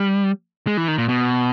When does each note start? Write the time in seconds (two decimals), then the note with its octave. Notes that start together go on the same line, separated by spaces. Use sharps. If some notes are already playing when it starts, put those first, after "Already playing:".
Already playing: G3
0.67 G#3
0.77 E3
0.88 D#3
0.98 A#2
1.09 B2